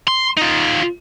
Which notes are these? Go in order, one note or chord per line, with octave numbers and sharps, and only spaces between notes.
C6
D#4 F4